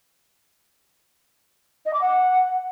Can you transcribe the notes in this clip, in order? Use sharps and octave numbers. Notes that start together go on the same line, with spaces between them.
D#5
D6
F#5